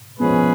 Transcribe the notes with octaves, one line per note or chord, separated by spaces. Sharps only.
F3 G#3 B3 C#4 G#4 B4